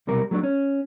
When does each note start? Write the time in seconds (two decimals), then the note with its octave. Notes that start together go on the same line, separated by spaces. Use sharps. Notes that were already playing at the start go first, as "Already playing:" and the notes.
0.07 B1 C3 G3 A#4
0.31 F#3 A3 B3 D4
0.43 C#4